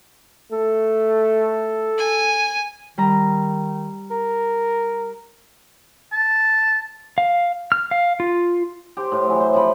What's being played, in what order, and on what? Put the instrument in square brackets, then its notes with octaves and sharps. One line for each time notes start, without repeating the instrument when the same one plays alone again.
[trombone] A3 [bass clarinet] A4
[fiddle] G#5
[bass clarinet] D#3 [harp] G3 A#5
[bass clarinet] A#4
[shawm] A5
[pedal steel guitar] F5
F6
F5
F4
[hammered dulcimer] G4 C5
A2
E3 F#3
C5
C3 F3 C4 B5